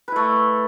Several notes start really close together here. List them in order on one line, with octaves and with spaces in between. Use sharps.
B4 E4 A3